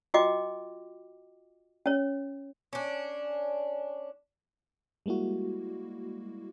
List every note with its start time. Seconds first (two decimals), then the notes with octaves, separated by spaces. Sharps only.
0.14 F4 F#4 D#5 G5 D6
1.86 C#4 C#5
2.73 C#4 D4
5.06 G3 G#3 A#3 E4 F#4